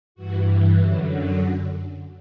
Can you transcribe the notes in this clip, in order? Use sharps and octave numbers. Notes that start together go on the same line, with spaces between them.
G2 E3 F#4
F#2 D3 F#3 E4